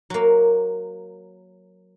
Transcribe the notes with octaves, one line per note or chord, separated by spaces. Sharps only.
F#3 A#3